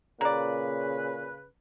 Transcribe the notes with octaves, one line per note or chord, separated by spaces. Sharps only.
A#2 C#3 A#3 B4 D5